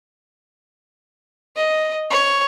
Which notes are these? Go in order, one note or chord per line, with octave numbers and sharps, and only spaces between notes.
D#5
C#5